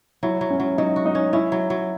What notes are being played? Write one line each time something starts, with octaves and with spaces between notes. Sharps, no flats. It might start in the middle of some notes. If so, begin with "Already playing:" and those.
F#3 E4
F#3
C#4
F#3
F#3 D#4
F#4
D#4
C#4
C#4 E4
F#3
F#3